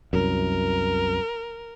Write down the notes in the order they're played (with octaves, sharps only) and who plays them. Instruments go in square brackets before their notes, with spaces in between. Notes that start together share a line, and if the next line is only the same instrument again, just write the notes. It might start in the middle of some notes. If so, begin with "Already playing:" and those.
[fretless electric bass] C2 F#2 [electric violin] A#4